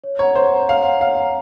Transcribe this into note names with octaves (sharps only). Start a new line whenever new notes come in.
C#5
C#5 F#5 A#5
C5 C#5
F#5 A#5
C#5 F5
F#5 A#5
C#5 F5
F#5 A#5